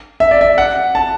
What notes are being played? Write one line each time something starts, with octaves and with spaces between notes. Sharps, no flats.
E5
D5
E5
F#5
A5